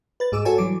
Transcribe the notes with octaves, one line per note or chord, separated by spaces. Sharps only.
B4 A6
G#2 G#4 D6 E6
F#4 A4 C#5 G#5 A5
E3 F#3 G3 D6